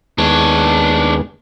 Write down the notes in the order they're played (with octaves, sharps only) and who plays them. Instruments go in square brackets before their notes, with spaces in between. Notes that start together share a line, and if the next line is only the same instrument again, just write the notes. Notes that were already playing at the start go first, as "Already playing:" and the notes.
[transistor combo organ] D#2 G#3 B3 [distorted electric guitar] D4 C#5